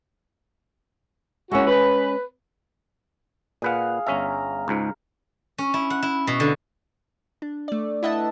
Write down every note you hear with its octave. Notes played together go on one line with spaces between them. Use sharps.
G#3 A#3 C#4 E4 F#4
B4
A#2 G#4 B4 F5 F#5
G1 C#4 E5 A#5
C#2 G#2
C#4
E4
F#5
E4
B2
D3
D4
A3 D5
E4 B4 D#5 E5 F#5 A5